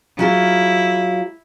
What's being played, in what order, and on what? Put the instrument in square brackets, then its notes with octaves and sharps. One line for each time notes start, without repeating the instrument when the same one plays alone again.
[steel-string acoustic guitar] F#3 F4 G#4 [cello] E4